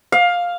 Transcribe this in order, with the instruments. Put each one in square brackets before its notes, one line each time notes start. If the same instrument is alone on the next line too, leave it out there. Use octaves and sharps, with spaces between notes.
[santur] F5